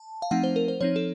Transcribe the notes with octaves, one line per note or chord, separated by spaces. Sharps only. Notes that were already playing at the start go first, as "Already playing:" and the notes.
Already playing: A5
F5
F3 A3 C4 D#4 F#5
C5
A#4
C5
F3 C4 D#4 C#5
A4